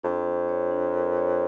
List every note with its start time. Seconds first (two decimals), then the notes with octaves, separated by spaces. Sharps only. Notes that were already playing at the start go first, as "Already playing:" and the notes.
0.03 F2 D4
0.26 D4
0.49 C#5
0.71 D4
0.94 A#4
1.17 C#5